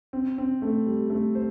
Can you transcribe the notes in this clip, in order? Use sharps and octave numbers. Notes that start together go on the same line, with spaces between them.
C4
C4
A3
G3
A3
C5